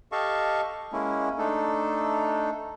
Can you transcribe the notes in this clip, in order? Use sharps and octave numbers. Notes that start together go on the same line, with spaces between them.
G4 A4 D#5 F5 A5 C#6
G#3 A#3 C#4 E4
A3 D4 D#4 A4